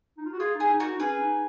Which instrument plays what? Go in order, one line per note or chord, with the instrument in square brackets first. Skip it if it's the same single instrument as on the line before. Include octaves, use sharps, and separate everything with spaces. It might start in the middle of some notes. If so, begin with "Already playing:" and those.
[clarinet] D#4
F4
F#4
[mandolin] F4 [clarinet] G#4
[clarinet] D#4
[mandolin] G#4
[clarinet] D#4
[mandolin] F#4 A#4
[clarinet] D#4
[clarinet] C#4 [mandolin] G#4 B4
[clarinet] D#4